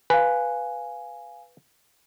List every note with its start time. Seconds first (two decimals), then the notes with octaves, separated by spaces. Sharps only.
0.10 B4 F5 G#5